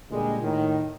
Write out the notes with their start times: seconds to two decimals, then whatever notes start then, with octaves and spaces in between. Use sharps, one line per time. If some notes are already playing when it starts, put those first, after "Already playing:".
0.11 A#2 D3 G3 G#3
0.41 A2 D#3